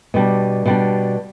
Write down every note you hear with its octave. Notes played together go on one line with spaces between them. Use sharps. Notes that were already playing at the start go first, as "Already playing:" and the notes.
B2 G3 D4
B2 G3 D4